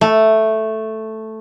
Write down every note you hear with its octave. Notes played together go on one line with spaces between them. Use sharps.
A3